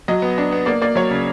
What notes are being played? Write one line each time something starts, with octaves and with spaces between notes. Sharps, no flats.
F#3 D#5
B3
D4
B3
A#3 D5
A#3 D5
F#3 C#5
C#3